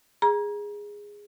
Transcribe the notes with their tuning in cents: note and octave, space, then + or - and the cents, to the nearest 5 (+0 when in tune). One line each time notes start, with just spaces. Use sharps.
G#4 -10 A#5 +30